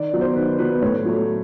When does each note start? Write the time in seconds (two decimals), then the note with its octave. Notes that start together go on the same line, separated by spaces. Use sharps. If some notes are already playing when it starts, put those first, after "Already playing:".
Already playing: D#3 D5
0.14 F#3 B3
0.21 C5
0.35 D#3 B4
0.59 F#3 B3 B4
0.82 A2 C#5
1.05 F#3 A3